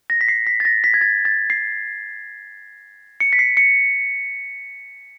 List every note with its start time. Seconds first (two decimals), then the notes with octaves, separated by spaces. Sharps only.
0.10 A#6
0.21 B6
0.28 C7
0.47 B6
0.60 A6
0.65 A#6
0.84 B6
0.94 G#6
1.01 A6
1.25 A6
1.50 C7
3.20 C#7
3.33 B6
3.39 C7
3.57 C#7